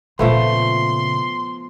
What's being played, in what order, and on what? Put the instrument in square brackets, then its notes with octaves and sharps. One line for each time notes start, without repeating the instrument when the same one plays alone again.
[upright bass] A#2 C#3 [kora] F3 A3 B3 [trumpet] C6